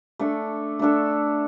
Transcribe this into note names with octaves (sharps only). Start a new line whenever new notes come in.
A3 D4 A4
A3 D4 A4